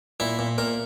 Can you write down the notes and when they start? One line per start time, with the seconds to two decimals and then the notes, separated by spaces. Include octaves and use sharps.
0.20 A#2 E4
0.39 A#2
0.58 A#2 A#4